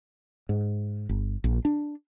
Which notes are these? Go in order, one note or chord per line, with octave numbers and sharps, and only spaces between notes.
G#2
G1
A#1
D4